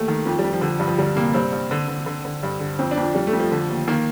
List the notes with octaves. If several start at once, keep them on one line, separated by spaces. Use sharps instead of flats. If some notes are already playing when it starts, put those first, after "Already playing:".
Already playing: D#2 A3
D#3
F2 F3
G3
F2
F3
D3
G2
F3
D2 G3
C3 A#3
G2 C4
G2
D3
D3
D3
D3
G2
D3
F2 C4
D4
F2
F3
F2 G3
A3
F2
F3
D3
D#2
D#3 A#3